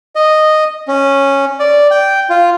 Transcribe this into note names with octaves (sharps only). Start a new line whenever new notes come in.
D#5
C#4
D5
G5
F4